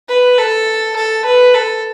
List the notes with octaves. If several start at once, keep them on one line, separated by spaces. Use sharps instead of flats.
B4
A4
A4
B4
A4